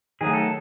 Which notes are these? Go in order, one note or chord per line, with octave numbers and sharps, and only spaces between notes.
D#3 F#3 A3 G#4
A4